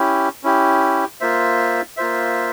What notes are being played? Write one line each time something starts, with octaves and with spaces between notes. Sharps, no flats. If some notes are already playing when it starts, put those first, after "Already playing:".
Already playing: C#4 E4 G4
C#4 E4 G4
A#3 F4 C5 E5
A#3 F4 C5 E5